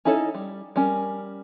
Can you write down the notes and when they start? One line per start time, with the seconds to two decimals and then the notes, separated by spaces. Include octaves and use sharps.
0.05 C#4 D#4 E4 A4 C#5
0.34 G3
0.76 G3 C#4 A#4